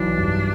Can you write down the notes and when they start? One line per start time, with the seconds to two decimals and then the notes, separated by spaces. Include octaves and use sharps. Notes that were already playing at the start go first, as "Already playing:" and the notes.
Already playing: B1 E3 D4
0.18 G2